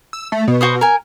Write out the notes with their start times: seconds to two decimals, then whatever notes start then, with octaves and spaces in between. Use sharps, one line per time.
0.13 E6
0.32 A3
0.48 B2
0.61 F#4 C5 D#6
0.81 A#4 G#5